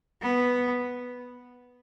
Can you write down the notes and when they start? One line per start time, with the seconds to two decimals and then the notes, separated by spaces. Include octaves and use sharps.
0.21 B3